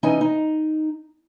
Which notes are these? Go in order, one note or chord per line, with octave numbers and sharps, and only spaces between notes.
E3 C#4 D#4 D#5 G#5
D#4